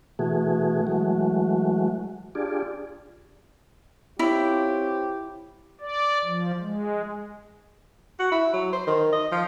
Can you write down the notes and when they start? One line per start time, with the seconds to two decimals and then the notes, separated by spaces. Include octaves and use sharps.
0.19 B2 E3 A3 F#4 G#4
0.87 E3 F#3 G#3 A3 F#4
2.35 D4 F4 G4 G#4 D5
4.19 C4 E4 F4 G4 C#5
5.81 D5
6.25 F3
6.61 G#3
8.19 F#4
8.32 E4
8.53 F#3
8.73 C5
8.87 D#3
9.13 D#5
9.32 F3